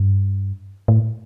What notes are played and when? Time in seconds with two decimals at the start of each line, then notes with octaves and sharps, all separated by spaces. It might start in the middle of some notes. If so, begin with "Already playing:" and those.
Already playing: G2
0.88 A2